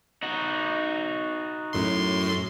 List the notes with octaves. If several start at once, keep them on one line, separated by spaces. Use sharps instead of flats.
D#4 F#4
F#2 A2 C6